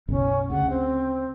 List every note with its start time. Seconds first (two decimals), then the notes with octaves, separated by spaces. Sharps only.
0.08 F#1 B1 C#4
0.50 D2 C#3 F#5
0.70 C4